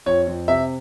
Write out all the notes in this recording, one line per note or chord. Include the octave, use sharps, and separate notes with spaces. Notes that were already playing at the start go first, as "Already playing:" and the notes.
F2 C#5
F2
C3 E5